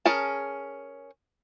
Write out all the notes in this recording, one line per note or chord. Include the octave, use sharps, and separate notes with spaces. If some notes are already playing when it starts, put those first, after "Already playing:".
C#4 G#4 A#4 A5